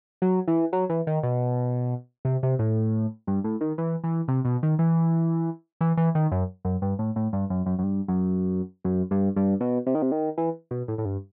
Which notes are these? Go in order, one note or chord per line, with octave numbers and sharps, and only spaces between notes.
F#3
E3
F#3
E3
D#3
B2
C3
C3
A2
G2
A2
D#3
E3
E3
C3
B2
D#3
E3
E3
E3
D#3
F#2
F#2
G2
A2
A2
G2
F#2
F#2
F#2
G2
F#2
F#2
G2
G2
B2
C3
D#3
C3
D#3
E3
B2
A2
A2
G2